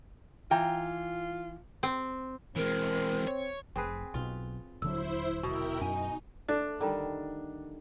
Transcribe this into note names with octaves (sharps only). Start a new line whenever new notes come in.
E3 F4 G5 A#5
C4
E3 G#3 C4 A#4
C#5
F1 C4 G#4 B4
B1 B2 F4
D#1 D3 F#3 E4 C5 E6
B2 E4 A#4 G5
F#2 D#4 G#5
A3 D4
D3 D#3 G3